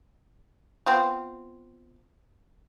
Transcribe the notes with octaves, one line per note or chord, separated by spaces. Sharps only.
B3 C4 F4